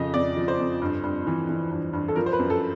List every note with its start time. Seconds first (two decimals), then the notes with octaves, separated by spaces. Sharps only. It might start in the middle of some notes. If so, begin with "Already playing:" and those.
Already playing: F2 C#3 F3 D#5
0.14 F2 D5
0.37 F3
0.48 C5
0.59 F2
0.81 G2
1.04 G2
1.27 E3
1.49 E3
1.71 G2
1.93 G2
2.08 A4
2.16 F3 A#4
2.26 C5
2.33 B4
2.39 F#2
2.50 A4